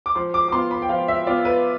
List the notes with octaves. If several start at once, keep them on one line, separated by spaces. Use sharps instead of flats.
D6
F3 C6
D6
D6
B3 F4 C6
B5
G5
F3 F5
E5
B3 F4 D5
B4